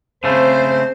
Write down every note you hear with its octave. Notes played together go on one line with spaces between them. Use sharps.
C#3 A3 C4 C5